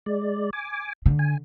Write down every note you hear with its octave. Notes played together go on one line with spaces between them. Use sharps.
G#3 D5
G#5 D6
D3
G#5